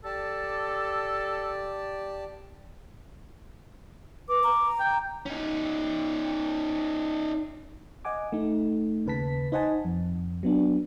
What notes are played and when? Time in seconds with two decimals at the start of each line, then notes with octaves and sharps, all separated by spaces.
0.05 G4 A4 D5 A5
4.29 B4 D6
4.44 A#5
4.79 G5
5.26 C#4 D#4
8.05 D#5 F#5 G#5 D6
8.32 A3 D#4
9.06 D#2 C#3 B4 A5 B6
9.52 D#4 C5 D#5 F#5 G#5 A5
9.85 F2
10.43 F#3 B3 D4